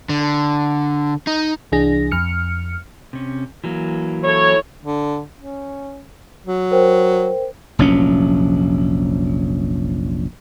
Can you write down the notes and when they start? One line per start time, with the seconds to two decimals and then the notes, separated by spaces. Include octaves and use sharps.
0.09 D3
1.27 D#4
1.72 C2 E3 D4 G#4 A#6
2.12 F2 F6 C#7
3.13 C3 C#4
3.64 E3 F#3 A#3
4.22 E4 A4 C#5
4.82 D3
5.37 C#4
6.47 F#3
6.71 A#4 C5 G5
7.79 F1 A#1 F#3 C#4